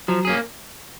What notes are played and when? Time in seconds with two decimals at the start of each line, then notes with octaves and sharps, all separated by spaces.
0.08 F3 F#3
0.25 A#3 C#4 G#4